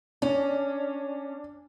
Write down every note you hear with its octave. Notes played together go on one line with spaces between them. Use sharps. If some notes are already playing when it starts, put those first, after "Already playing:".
C#4 D4